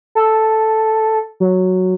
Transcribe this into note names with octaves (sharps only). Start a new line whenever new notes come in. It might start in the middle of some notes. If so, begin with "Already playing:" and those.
A4
F#3